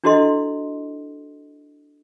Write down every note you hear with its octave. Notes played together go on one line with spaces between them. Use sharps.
D4 E4 F#4 A4 D#5 C6